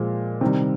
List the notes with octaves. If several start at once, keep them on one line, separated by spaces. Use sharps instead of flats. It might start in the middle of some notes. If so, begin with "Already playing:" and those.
Already playing: A#2 F3 G#3
C3 D#3 G3